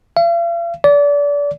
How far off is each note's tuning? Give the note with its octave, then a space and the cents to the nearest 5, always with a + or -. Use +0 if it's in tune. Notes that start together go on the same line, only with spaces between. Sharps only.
F5 -45
D5 -30